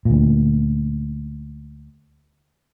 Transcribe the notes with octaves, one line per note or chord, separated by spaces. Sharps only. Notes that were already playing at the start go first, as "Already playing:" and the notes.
D2 A#2